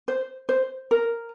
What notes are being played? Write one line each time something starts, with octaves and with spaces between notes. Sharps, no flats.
C5
C5
A#4